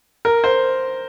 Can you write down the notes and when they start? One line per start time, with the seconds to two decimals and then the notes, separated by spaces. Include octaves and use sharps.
0.25 A#4
0.44 C5